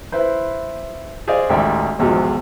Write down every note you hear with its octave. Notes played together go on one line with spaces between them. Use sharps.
E4 B4 C5
G#4 C5 D5 D#5 F5
A1 D2 D#3 G#3 D5 E5
B1 E2 G#2 D#3 F3 F#3